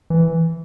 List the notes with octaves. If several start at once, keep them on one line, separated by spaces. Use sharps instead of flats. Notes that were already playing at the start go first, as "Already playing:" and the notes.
E3